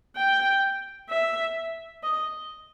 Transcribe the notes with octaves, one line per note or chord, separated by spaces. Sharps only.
G5
E5
D#5